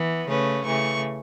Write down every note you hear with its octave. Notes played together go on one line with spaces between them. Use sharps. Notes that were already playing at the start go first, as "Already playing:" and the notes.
Already playing: E3 B3
C#3 A3 C#4 B4
C#3 E3 A3 C#6